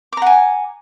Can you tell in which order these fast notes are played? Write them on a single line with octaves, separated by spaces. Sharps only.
D6 A#5 F#5 G#5